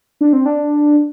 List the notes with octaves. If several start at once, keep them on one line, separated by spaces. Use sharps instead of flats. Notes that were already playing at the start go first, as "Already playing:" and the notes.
D4
C4
D4